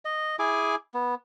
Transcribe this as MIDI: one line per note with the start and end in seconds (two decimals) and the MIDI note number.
0.05 0.36 75
0.39 0.75 64
0.39 0.75 68
0.39 0.75 80
0.39 0.75 86
0.94 1.15 59